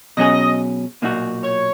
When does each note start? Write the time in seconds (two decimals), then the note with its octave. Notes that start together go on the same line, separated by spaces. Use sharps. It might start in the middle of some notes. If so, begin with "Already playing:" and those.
0.17 B2 F#3 C#4 G#4 D#5
1.02 B1 A#2 A#3 D#4 F#4
1.43 C#5